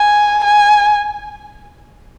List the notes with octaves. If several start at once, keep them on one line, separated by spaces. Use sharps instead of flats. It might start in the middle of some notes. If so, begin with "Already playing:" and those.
Already playing: G#5
G#5